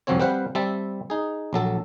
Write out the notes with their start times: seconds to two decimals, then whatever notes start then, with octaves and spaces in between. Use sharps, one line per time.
0.07 C2 F2 F3 F#3 C4 C#5
0.20 G3 C4 B4 C5 F5 F#5
0.55 G3 C4 E5 A5
1.10 D#4 G#4
1.53 A#1 F#3 A4